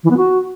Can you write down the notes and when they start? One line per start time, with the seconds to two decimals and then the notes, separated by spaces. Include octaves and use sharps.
0.03 E3
0.10 B3
0.17 F#4